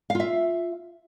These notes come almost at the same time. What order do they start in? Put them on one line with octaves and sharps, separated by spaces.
F5 F4 E5